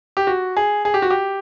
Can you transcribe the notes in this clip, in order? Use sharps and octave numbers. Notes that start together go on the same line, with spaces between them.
G4
F#4
G#4
G#4
G4
F#4
G4